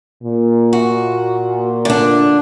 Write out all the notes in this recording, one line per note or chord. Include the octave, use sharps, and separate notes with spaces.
A#2
F#4
D3 D4